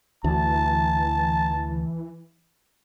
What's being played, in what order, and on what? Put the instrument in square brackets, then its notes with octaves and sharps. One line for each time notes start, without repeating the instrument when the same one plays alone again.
[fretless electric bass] D2 [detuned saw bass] E3 [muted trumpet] A5